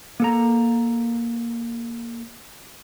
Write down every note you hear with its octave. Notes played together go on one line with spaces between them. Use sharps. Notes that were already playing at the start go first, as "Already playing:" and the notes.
A#3 A4 A#5